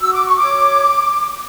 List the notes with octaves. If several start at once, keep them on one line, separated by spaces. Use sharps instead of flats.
F#4 E6
D6
C#6
C#5 D6